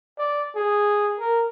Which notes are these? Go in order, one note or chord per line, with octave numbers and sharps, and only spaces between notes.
D5
G#4
A#4